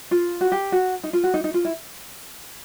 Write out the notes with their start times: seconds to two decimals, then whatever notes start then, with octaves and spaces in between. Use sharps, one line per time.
0.11 F4
0.41 F#4
0.52 G4
0.72 F#4
1.04 D#4
1.13 F4
1.24 F#4
1.34 D#4
1.44 D#4
1.54 F4
1.65 E4